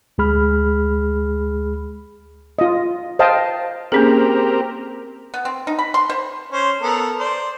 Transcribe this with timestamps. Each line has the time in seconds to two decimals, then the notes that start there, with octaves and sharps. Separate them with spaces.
0.18 D2 G#3 G#4 B5 F6
2.59 F4 D#5
3.19 C5 D#5 F5 G5 A5
3.92 A#3 C4 C#4 G4 G#4 A#4
5.34 B3
5.45 C4
5.67 D#4
5.79 B5
5.94 C6
6.10 C5
6.52 C#4 C5
6.82 B3 A4 A#4
7.19 C5 D5